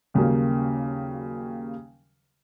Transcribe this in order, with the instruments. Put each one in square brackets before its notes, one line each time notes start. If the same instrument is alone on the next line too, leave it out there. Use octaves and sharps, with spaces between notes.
[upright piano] D#2 C#3 F#3 G3 A#3